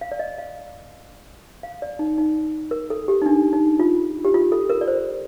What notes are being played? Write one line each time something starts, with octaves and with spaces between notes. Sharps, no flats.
F5
D5
D#5
F5
F5
D5
D#4
D#4
A#4
A4
G4
D#4
D4
D#4
F4
G4
F4
A4
A#4
D5
C5